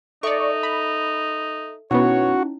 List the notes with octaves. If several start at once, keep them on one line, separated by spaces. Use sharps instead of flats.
D#4 A4 D5 E5 C#6
B5
B2 B3 C#4 D#4 E4 F#4 C#5